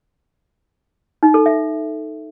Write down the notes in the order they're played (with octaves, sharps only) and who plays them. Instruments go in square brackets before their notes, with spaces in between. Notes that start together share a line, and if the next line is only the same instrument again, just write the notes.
[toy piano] D#4
A4
E5